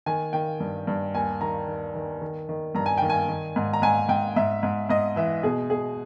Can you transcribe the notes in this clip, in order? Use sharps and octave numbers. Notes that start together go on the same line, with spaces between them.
D#3 G#5
D#3 G5
G2
G2
D#2 G#5
D#3 A#5
D#3
D#3
D#3
D#3
G2 A#5
G#5
D#3 G5
G#5
D#3
G#2
A#5
G#2 G#5
G#2 G5
G#2 E5
G#2
G#2 D#5
E3 E5
B2 G#4
B2 G#4